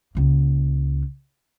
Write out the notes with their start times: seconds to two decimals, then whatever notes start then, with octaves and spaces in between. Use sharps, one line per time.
0.15 C#2 A#3